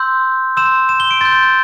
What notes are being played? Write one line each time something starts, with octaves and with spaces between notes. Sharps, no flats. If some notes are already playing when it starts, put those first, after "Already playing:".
Already playing: C6 E6 G6
C6 E6 G6 E7
E7
G7
D7
C6 G6 A6
G6
G6